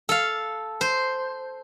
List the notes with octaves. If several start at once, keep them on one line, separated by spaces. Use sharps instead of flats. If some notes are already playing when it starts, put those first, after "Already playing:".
A4 F5
C5